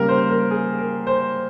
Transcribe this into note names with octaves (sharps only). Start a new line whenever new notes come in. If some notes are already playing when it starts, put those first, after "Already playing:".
Already playing: C#3 G3 A#3 A#4
C5
A#4
G#4
A#4
C5